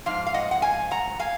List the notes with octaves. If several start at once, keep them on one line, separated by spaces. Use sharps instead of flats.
G#2 F3 F5
F5
D#5 F#5
F#5
F5 G#5
F#5 A#5
F5 G#5